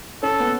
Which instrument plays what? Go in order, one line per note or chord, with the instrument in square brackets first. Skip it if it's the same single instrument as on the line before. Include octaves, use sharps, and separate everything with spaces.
[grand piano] C#4 [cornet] A4
[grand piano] B3